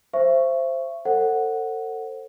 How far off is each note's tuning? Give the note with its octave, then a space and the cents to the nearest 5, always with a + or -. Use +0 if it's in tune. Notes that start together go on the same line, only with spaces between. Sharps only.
C5 +0 E5 +35 C#6 +0
A4 +35 C5 +30 F#5 +0